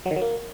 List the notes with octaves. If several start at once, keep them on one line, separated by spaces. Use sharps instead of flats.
F#3
D#3
F#3
A#3